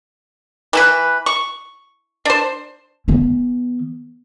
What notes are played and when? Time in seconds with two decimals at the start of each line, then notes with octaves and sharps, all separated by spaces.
0.73 E3 E4 B4
1.26 C#6
2.25 D4 C5
3.08 E3 B3